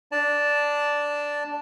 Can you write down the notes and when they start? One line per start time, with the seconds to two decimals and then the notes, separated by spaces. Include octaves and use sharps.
0.12 D4 D5 A5